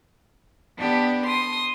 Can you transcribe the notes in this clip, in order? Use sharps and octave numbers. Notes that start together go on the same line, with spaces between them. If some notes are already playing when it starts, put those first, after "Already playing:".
B3 D4 G4
C6 D#6